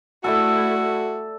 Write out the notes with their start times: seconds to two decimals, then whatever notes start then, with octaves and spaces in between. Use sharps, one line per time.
0.24 A3 E4 F#4 A4 D5 E5